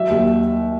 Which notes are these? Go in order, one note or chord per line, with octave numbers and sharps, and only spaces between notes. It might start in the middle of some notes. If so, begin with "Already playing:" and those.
Already playing: F#3 E5
D#2